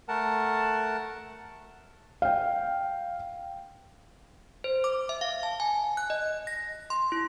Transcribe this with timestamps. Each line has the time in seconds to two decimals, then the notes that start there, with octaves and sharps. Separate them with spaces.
0.08 A3 A#4 F#5 A5
2.22 F5 G5
4.64 C5
4.84 D6
5.09 E5
5.21 F5
5.43 A5
5.60 G#5
5.97 F#6
6.10 D#5
6.47 A#6
6.90 C6
7.12 E4